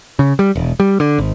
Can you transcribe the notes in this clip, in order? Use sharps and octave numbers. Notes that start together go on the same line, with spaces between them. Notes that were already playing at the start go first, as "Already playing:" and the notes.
C#3
G3
E1
G3
D3
G#1